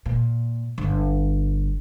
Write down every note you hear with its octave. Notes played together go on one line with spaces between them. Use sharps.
A#2
G1